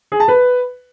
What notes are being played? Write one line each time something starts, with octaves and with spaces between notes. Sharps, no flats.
G#4
A5
B4